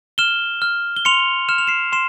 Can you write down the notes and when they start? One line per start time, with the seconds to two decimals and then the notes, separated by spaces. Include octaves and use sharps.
0.18 F6 E7 G7
0.62 F6
0.96 G7
1.05 C6 C#7 F7
1.49 F6 E7
1.58 F7
1.67 C7 E7
1.92 C6 C7 E7